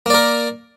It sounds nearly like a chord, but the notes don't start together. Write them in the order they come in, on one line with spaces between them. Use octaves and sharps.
A#3 D5 A#4